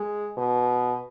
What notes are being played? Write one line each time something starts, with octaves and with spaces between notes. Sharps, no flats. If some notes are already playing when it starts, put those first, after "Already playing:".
Already playing: G#3
B2